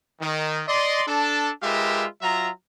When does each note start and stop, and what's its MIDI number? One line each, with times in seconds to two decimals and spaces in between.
0.21 0.62 51
0.68 1.03 74
0.68 1.03 75
0.68 1.03 84
1.08 1.51 62
1.08 1.51 69
1.08 1.51 81
1.62 2.06 56
1.62 2.06 65
1.62 2.06 67
1.62 2.06 70
1.62 2.06 71
1.62 2.06 76
2.22 2.50 54
2.22 2.50 65
2.22 2.50 76
2.22 2.50 82